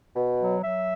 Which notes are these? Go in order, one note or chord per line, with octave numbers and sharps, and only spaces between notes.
B2
F#3
F#3 E5